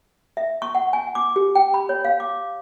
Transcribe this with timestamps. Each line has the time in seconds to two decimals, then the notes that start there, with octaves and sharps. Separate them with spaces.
0.37 E5
0.62 C#6
0.75 F#5
0.93 G#5
1.15 D6
1.36 G4
1.55 G5
1.74 B5
1.89 C#5
2.05 F5
2.20 D6